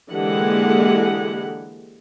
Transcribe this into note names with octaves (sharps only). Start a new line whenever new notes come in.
D3 E3 G#3 A#3 G4 F#5